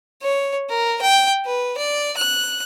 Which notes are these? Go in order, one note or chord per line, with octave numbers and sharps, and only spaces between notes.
C#5
A#4
G5
B4
D5
F#6